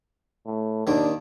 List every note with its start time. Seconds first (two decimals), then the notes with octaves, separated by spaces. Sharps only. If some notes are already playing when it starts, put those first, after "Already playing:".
0.46 A2
0.87 D#2 D#3 D4